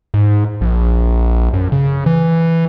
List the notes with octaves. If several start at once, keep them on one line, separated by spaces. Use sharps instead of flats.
G#2
A#1
F#2
C#3
E3